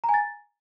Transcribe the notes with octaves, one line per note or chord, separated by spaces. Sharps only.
A#5
G#5
A6